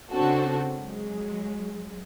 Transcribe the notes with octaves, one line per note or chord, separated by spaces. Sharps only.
C#3 C4 D4 F#4 A4
F#3 G#3